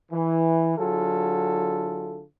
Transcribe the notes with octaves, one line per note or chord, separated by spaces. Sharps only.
E3
D3 F#3 E4 F4 G#4 A4